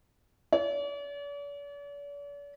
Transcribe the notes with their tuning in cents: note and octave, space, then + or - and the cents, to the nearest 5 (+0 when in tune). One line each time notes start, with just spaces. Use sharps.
D5 -45